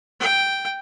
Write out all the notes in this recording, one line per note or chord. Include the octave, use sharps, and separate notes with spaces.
G5